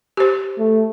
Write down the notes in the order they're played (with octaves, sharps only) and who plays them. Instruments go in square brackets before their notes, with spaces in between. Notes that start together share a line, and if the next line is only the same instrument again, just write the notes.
[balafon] G4 C5
[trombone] A3